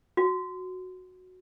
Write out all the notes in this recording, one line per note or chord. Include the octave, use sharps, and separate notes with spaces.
F#4